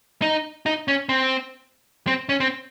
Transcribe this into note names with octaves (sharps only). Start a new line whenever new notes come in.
D#4
D#4
C#4
C4
C4
C#4
C4